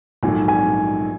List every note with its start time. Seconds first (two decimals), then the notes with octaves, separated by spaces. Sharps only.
0.23 A#1 G#2 D#3 F#3 A3 G#5
0.48 G#5